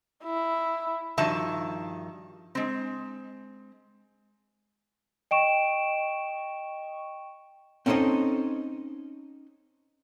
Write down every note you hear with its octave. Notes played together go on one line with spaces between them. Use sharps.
E4
G2 D#3 F3 F#4 E5 A5
G#3 C4
D#5 G5 C#6 D7 E7
C4 C#4 D#4 A4 C5 D#5